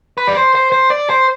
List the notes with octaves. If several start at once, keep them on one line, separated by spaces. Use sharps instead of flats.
B4
D5
C5
C5
C5
D5
C5